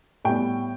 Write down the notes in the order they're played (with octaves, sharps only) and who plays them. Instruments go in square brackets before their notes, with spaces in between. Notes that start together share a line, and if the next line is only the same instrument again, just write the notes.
[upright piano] A2 G3 B3 G5